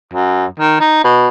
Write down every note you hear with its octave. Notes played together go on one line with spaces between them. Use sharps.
F#2
D#3
D#4
B2